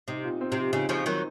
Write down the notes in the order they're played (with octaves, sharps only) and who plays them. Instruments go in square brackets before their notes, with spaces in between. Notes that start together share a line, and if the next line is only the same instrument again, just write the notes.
[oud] C3 [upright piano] D#4
[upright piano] A#2
C4
[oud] C3
[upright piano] F3
[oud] C#3 [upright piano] D#4
[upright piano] A#2 [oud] C#3 F3
[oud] D#3 F#3 [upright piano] C4